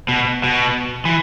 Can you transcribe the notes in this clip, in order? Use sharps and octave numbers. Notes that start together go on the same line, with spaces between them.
B2
B2
E3